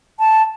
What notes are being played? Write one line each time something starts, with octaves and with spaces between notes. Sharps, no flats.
A5